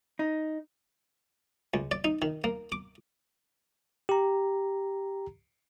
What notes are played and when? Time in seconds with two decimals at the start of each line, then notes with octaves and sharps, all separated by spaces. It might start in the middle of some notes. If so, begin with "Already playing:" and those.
0.19 D#4
1.74 C#2
1.91 D5
2.04 D#4
2.22 D#3
2.44 A#3
2.72 D6
4.09 G4 A#5